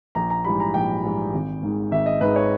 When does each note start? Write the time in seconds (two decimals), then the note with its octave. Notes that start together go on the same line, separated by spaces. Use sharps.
0.15 A#1 A#5
0.30 A#5
0.44 G#2 E3 G3 B5
0.60 A#5
0.74 A#1 G5
1.04 G#2 E3 G3
1.33 G#1
1.63 G#2 D#3 G#3
1.91 G#1 E5
2.06 D#5
2.21 G#2 D#3 G#3 B4
2.36 C#5